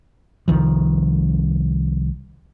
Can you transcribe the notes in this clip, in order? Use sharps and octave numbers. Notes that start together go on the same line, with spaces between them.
C2 D#3 F3